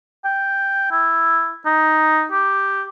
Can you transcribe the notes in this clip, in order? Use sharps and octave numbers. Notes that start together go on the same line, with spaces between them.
G5
E4
D#4
G4